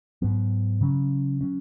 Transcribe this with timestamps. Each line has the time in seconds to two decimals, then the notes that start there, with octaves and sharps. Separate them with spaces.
0.22 G#2 F#3 B3
0.81 C#3 F#3 C#4
1.41 F#3 C#4